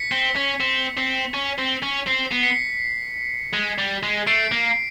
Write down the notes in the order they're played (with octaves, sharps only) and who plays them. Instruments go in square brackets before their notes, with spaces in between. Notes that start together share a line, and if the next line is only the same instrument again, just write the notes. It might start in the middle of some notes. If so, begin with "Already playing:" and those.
Already playing: [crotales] B6 C#7
[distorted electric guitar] C4
C#4
C4
C4
C#4
C4
C#4
[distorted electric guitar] C4 [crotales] C7
[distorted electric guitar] B3
[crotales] B6 C#7
[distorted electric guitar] G#3
G3
G#3
[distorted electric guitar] A3 [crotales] C7 D7
[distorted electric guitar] A#3